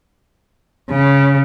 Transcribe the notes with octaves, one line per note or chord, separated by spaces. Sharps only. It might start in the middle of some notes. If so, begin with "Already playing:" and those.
C#3